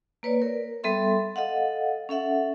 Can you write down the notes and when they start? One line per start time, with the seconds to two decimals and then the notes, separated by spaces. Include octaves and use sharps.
0.23 A#3 B4 C#5 D5
0.42 A#4
0.84 G3 B3 A4 E5 C6
1.36 A4 D#5 F5 F#5
2.09 C#4 A4 E5 F#5